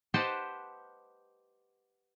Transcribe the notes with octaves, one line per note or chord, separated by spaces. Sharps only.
G4 B4 C5 D#5 F#5 A5